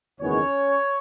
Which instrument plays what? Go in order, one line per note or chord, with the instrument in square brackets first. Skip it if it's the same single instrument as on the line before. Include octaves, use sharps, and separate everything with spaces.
[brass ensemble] F#1 E2 D#3 G#3 B3 C#4 C#5